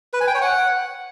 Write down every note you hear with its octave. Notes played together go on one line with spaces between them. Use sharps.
B4
G#5
G5
C#5
F#5